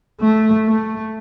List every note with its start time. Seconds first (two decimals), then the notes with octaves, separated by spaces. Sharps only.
0.21 A3
0.67 A3